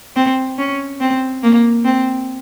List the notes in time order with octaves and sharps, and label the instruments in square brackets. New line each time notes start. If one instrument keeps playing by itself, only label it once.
[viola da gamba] C4
C#4
C4
A#3
C4